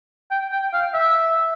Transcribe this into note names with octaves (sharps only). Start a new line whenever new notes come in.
G5
G5
F5
E5